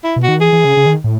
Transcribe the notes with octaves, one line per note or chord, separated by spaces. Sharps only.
E4
B2
F#4
D#3
E3 G#4
E3
C#3
C#3
D#3
A2